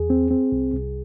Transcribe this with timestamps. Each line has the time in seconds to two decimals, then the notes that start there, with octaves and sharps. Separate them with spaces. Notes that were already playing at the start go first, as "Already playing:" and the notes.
Already playing: E2 G#4
0.10 C4
0.31 C4
0.52 C2
0.74 C2